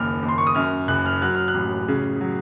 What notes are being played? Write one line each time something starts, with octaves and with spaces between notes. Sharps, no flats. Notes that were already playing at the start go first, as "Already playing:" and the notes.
Already playing: F#1 D#2 F6
D#2
C6
C#6
D#6
F#2 F6
F#1 F#6
F6
F#3 F#6
F6
F#6
A1
C#3
F#3